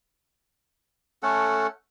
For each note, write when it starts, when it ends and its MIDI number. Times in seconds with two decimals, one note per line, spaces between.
1.23 1.67 57
1.23 1.67 61
1.23 1.67 69
1.23 1.67 78